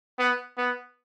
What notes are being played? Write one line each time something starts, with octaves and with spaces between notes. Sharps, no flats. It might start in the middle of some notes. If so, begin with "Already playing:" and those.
B3
B3